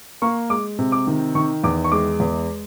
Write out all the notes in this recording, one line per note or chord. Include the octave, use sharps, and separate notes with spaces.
A#3 C#6
G#3 D6
C3
D6
D#3
D#3 C#6
E2 D6
C#6
G#3 D6
E2